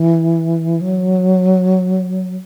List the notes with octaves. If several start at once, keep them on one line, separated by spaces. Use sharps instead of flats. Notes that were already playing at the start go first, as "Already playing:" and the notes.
Already playing: E3
F#3